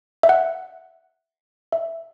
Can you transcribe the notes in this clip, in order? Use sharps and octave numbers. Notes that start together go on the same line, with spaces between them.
E5
F#5
E5